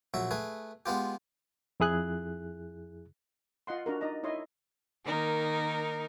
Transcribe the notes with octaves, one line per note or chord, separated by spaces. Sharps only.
A#1 F#3 E5
A3 G#4 B4
G#3 B3 F4 G4
F2 E4 G#4 F#6
F4 D#5 F#5 C6
D4 F#4 A#4
D#4 D5 D#5 A#5
D#4 E4 C#5 D#5 C6
D#3 A#3 D#4 A#4